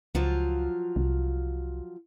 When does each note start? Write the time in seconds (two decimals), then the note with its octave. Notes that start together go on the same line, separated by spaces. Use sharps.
0.15 C#2 F3 F#3 F4
0.96 C2